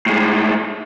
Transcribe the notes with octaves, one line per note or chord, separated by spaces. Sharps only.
A2 G#3